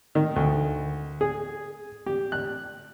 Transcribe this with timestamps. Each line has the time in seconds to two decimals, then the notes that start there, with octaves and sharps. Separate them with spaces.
0.15 D#3
0.36 D2
1.21 G#4
2.06 G4
2.32 F#6